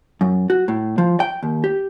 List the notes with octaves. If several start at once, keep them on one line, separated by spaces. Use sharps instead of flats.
F#2
F#4
A2
F3
G5
D#2
G4